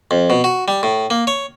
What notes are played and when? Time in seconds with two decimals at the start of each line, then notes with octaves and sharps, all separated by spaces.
0.11 F2
0.30 B2
0.44 F#4
0.68 G3
0.83 A2
1.10 A#3
1.27 C#5